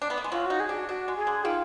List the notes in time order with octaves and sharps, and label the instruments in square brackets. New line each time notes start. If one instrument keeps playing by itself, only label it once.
[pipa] D4
B3
A#3
G#3
[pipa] F#3 [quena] F4
[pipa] D#4 [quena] F#4
[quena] G#4
[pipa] D4
[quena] F#4
[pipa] D4 [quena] F#4
[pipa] G#3
[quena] G#4
[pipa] D3
[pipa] D#3 [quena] F4